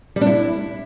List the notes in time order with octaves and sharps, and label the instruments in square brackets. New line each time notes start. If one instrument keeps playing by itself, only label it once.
[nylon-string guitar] G3
D4
E4